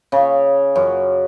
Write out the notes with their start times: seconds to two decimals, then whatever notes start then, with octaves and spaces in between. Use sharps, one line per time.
0.12 C#3
0.76 F#2